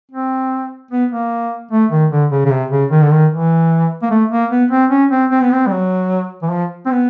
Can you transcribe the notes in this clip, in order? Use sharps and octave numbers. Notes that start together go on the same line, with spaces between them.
C4
B3
A#3
A3
D#3
D3
C#3
C#3
C3
C#3
D#3
D3
D#3
E3
A#3
A3
A#3
B3
C4
C#4
C4
C4
B3
C4
G3
F#3
E3
F3
C4
B3